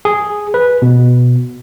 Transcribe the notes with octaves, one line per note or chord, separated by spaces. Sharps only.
G#4
B4
B2